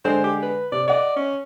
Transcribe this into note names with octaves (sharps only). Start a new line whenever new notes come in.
D3 G#3 C5
G4
B4
C3 D5
D5 D#5 F#5
C#4